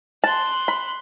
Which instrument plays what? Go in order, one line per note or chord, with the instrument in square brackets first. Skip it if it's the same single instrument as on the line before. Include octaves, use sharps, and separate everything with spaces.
[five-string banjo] A5 [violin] C6 F#6
[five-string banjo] B5